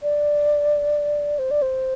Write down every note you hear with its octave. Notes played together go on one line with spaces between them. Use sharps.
D5
C5
D5
C5